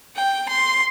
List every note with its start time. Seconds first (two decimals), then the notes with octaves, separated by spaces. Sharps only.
0.17 G5
0.50 C6